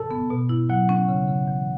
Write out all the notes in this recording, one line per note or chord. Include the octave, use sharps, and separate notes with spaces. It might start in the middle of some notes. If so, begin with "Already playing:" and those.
Already playing: A4
B3
B2
E4
F#3 F#5
C#4
C#3
C#3
E3